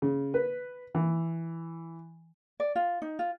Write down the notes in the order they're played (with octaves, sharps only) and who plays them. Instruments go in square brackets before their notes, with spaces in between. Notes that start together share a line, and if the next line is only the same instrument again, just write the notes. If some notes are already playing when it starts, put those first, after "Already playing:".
[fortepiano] C#3
B4
E3
[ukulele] D5
F4
D#4
F4